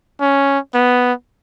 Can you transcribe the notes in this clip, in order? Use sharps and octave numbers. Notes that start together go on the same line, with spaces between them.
C#4
B3